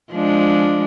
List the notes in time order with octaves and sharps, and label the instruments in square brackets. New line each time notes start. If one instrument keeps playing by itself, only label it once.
[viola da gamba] F3 G#3 D4